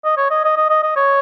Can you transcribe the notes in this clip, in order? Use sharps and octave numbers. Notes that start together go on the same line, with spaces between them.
D#5
C#5
D#5
D#5
D#5
D#5
D#5
C#5